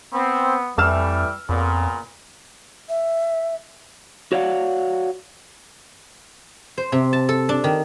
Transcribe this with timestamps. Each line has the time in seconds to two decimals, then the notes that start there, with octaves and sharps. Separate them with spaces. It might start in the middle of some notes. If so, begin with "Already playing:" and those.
0.13 B3 C4
0.78 F2 E3 G3 A3 E6 F6 E7
1.49 F2 A#2 C#3 B3
2.89 E5
4.32 F#4 C#5 D5 F5 F#5
6.78 C5
6.92 C3
7.13 A5
7.29 A4
7.49 D4
7.64 D#3